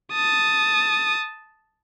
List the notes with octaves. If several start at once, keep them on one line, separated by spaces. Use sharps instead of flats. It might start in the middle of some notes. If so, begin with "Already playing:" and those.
A5 D#6